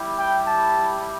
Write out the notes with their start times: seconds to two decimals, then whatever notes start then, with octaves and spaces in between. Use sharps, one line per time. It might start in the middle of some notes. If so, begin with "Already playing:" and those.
Already playing: G3 E4 G4
0.18 G5
0.47 A5